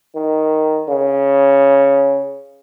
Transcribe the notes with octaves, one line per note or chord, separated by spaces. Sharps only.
D#3
C#3